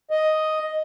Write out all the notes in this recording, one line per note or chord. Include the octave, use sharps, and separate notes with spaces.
D#5